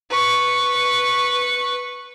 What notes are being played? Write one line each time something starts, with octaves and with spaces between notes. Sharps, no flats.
B4 C#6